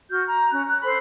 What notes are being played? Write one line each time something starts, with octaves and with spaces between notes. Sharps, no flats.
F#4 F6 G6
A#5
C#4 F#6
F#6
A4 C5 B5